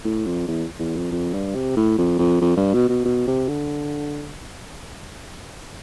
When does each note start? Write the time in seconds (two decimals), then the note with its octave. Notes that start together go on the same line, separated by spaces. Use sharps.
0.05 A2
0.26 F2
0.48 E2
0.79 E2
0.96 F2
1.12 F2
1.34 G2
1.55 C3
1.77 A2
1.98 F2
2.19 F2
2.41 F2
2.57 G2
2.73 B2
2.89 B2
3.05 B2
3.27 C3
3.48 D3